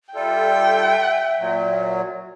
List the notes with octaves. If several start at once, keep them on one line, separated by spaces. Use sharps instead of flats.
G3 F4 A4 E5 G5
A#2 F#3